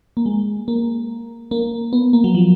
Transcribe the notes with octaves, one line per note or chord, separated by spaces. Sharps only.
A#3
G#3
A#3
A#3
B3
A#3
F#3
F3